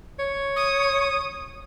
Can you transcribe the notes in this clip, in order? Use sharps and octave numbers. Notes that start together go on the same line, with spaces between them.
C#5
D#6